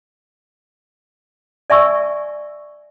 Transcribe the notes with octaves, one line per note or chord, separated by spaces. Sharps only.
D5 E5 G#5 C#6 E6